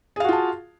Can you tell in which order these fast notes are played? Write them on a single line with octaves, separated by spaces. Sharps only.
G#4 F5 F#4 F4 A5